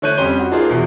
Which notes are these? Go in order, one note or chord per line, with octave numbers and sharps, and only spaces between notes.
D3 A3 C#5 F#6 G6 D#7
F2 G3 C#4 C6 D#7 G7
F#4
A#3 D4 D#4 F4 G#4 C5
E2 B2 E3